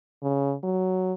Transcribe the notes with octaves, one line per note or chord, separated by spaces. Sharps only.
C#3
F#3